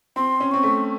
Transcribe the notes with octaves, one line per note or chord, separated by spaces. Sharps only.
C4 C6
C#4
C4 C#6
A3